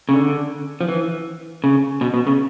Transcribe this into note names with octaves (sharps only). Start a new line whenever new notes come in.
C#3
D3
F3
E3
C#3
B2
B2
C#3